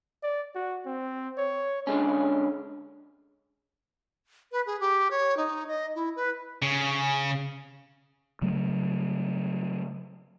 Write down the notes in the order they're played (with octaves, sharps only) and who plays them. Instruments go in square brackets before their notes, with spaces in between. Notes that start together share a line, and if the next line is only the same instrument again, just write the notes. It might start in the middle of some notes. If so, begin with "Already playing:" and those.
[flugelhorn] D5
F#4
C4
C#5
[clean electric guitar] D3 G#3 C#4
[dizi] B4
G#4
G4
C#5
D#4
D#5
E4
B4
[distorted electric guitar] C#3
[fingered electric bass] C#3 F#3 A3